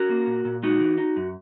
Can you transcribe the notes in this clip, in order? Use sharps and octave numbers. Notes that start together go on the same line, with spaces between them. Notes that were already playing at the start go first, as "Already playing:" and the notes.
Already playing: C#4 F#4 A#4
A#3
A#2
A#2
G#3 D#4 F#4
E3
D#4
F#2